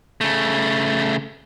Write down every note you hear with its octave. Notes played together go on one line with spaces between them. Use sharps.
C#3 A3